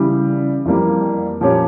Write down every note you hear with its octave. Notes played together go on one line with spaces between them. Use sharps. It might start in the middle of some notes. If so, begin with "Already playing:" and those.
Already playing: C#3 E3 G3
F2 E3 G3 A#3
A#2 F3 C#4 G4 C#5